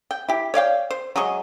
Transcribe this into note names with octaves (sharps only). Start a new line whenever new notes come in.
G5
E4 G4
C#5 D5 F5 G5
C5
F#3 G#3 D#5 C#6